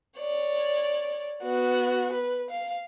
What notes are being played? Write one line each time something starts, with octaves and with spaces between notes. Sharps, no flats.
C#5 D5
B3 F#4
B4
F5